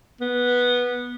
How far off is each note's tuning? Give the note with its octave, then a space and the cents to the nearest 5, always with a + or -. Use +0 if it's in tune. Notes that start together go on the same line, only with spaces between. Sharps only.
B3 -10